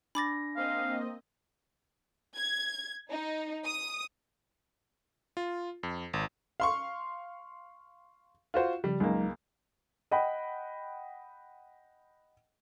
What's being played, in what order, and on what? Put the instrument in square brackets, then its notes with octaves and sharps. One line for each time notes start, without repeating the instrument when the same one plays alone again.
[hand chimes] D4 A#6 [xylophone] B5 D6 A6
[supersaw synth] A#3 C4 D#5 [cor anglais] F5
[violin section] G#6
D#4
D#6
[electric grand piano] F4
F2
G#1
[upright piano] F5 C6 C#6
F4 F#4 C5
[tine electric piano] C#3 F3 [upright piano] G3
[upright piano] C#2 A#3 [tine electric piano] F#3 G#3 D#4
[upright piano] D#5 F#5 G5 B5